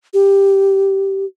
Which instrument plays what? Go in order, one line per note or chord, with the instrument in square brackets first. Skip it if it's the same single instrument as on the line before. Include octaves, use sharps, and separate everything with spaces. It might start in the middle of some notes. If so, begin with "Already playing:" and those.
[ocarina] G4